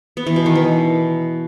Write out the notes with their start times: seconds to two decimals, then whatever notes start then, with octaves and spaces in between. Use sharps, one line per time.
0.17 B3
0.27 E3
0.36 B2
0.46 D#3
0.55 E3